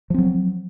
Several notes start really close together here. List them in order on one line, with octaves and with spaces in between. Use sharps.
F3 C4 F#3